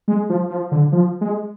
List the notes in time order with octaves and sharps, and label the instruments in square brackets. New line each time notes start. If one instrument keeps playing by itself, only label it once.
[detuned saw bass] G#3
F3
F3
D3
F3
G#3